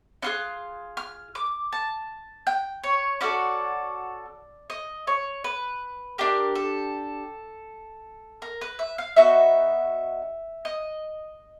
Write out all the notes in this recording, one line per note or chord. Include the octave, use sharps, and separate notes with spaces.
C#4 F4 G#4 F#6
F6
D6
A5
G5
C#5
C#4 F#4 A4 D5
D#5
C#5
B4
D4 G4 A#4
A4
A#4
B4
E5
F5
B3 D#4 F#4 E5
D#5